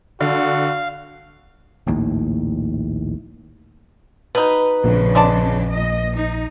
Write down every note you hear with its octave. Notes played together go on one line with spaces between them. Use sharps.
D3 F#4 F5
A#1 D#2 A2
B2 D#4 B4
A#1 F2 C#3 D4
G#3 D5 A5
A#2 D#5
D#4